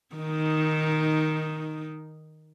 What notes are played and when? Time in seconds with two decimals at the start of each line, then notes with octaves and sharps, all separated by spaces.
0.15 D#3 D#4